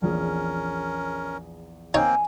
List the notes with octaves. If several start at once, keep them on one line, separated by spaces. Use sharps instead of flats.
A#1 E2 C#4 G#4 A#4
A#3 C4 D#4 C#5 G5 G#5